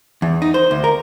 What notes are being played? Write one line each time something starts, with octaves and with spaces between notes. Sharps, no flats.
E2
D#4
C5
D2
A#4